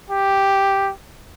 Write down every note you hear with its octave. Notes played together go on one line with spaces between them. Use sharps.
G4